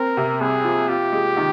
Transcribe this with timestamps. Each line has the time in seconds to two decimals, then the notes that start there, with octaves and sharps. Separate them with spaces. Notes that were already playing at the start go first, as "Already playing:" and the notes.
Already playing: C4 A#4
0.17 C3
0.41 C2 G#4
0.64 F3
0.88 F4 G4
1.13 G#3
1.37 D#3